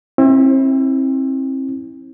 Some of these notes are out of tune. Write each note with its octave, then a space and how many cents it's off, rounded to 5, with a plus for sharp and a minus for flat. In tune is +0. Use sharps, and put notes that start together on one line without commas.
C4 +35 E4 -15